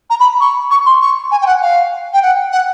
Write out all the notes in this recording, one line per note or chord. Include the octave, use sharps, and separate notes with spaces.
A#5
B5
C#6
C#6
C6
C#6
G#5
G5
F#5
F5
G5
F#5
F#5